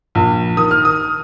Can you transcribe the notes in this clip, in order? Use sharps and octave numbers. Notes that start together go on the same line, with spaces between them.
A#1
D#3 D#6
F6
D#6